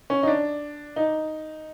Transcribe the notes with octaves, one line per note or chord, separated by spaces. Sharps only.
C#4
D#4
D4
D#4